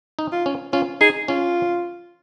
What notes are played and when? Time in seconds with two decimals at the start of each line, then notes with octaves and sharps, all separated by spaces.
0.19 D#4
0.32 F4
0.46 C#4
0.73 C#4 F4
1.01 D#4 G#4
1.28 C#4 F4